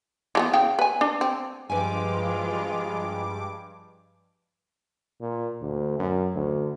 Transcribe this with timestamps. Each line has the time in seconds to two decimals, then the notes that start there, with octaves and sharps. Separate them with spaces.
0.35 E3 A3 B3
0.53 C#3 F5 G5
0.79 B4 G#5
1.01 D4
1.21 C4
1.70 G2 F3 G#3 F4 B4 G#5 D6
5.21 A#2
5.61 D2
5.99 F#2
6.35 D2